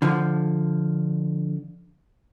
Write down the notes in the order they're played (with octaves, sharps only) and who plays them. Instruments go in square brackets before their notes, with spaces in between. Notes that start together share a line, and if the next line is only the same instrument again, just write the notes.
[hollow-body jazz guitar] D3 F3